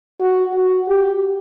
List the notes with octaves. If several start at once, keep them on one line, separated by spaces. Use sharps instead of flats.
F#4
F#4
G4